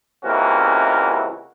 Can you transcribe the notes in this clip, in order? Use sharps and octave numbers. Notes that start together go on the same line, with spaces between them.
C#2 C3 E3 A#3 C#4 F#4